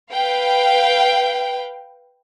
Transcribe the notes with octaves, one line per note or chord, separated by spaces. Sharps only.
B4 F5 G5